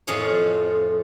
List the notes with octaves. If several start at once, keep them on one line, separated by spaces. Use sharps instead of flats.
F2 A2 F4 G#4 C#5